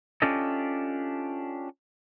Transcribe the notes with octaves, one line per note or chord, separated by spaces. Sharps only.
C#4 D4 F4 G4 A4 D#5